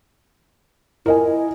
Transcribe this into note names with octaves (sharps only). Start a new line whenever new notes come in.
E4 A#4 D#5 G#5